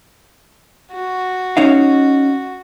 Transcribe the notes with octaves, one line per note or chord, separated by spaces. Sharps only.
F#4
C#4 D#4 F5